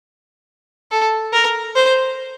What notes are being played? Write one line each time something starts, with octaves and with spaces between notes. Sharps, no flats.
A4
A#4
C5